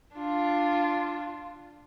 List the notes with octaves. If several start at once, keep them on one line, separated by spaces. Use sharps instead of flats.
D4 F4